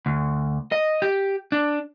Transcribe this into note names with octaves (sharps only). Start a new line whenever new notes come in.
D2
D#5
G4
D4